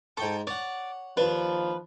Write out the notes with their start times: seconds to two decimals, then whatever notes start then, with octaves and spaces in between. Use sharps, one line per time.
0.17 G#2 A4 G5 C#6 D6
0.47 C#5 D5 F#5
1.17 D#2 F3 D4 B4